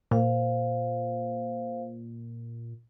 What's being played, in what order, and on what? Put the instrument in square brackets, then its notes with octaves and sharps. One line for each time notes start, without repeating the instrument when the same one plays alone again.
[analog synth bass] A#2 [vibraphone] C5 F5